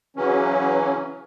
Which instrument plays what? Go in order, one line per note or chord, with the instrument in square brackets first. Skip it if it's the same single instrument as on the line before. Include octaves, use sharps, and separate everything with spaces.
[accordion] C#3 E3 F#3 C#4